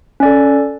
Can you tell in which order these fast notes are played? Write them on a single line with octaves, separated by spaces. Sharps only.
C#4 D5 A4